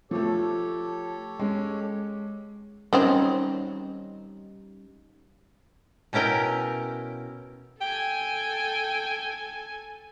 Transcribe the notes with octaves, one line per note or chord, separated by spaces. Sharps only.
F3 A3 G4 A4 C#5
G#3 C#4
D#3 F#3 G3 C4 C#4 D#4
B2 C#4 E4 A#4 G5
A4 G5 G#5